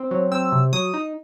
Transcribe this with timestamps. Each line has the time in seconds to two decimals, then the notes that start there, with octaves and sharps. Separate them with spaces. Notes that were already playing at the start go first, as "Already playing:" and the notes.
Already playing: C4
0.11 F#3
0.32 C4 E6
0.52 C3
0.73 F#3 D#6
0.94 D#4